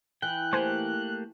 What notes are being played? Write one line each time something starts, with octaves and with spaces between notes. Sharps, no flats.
E3 G5 F#6
A3 A#3 G4 C5 G#5